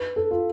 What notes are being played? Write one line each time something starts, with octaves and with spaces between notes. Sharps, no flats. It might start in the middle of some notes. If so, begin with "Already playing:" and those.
Already playing: B4
A4
F4